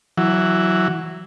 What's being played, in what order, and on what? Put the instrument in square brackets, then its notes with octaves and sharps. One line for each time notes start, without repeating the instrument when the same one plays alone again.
[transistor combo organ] E3 F#3